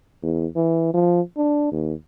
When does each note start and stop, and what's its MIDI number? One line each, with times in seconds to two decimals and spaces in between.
0.23 0.46 40
0.56 0.89 52
0.94 1.21 53
1.37 1.69 62
1.72 1.93 39